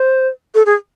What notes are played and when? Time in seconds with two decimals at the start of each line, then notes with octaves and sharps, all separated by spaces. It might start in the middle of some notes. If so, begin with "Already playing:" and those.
Already playing: C5
0.55 A4
0.66 G#4